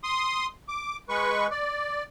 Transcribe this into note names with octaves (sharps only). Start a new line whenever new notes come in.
C6 D#6
D6
G#3 B4 C#6
D5